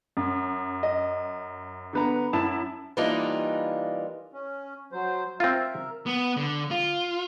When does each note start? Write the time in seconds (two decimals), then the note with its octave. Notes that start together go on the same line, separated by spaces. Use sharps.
0.17 F#2
0.83 D#5
1.93 D3 B3 A#5
2.33 F#2 E4 A5 E7
2.97 E3 G3 A#3 D4 D#4 F4
4.33 C#4
4.92 F#3 C5
5.40 C4 F4 A#4 E5
6.06 B3
6.37 D3
6.71 F4